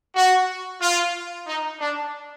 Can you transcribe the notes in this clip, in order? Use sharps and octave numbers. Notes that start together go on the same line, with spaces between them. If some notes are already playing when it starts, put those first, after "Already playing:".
F#4
F4
D#4
D4